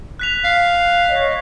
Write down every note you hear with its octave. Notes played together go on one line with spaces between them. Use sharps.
F#6 B6 F7
F5
C#5 D#5